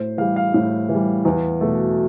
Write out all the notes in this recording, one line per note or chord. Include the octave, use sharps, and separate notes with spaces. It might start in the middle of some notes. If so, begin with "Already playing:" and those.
Already playing: A2 C5
E3 G3 F5
F5
A2
E3
G3
E2
B2 A3